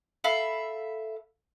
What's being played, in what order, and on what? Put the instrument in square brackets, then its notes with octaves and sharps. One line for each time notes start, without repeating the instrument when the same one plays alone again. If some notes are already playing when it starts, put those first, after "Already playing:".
[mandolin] A4 E5 F5 B5